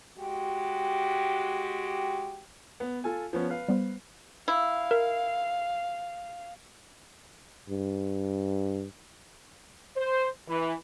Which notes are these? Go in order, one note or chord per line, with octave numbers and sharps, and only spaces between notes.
G#3 F#4 G4
B3
F4 A4 G#5
F3 B3 C#4
B4 F5
G3 B3 C5
E4 F5
A#4
G2
C5
E3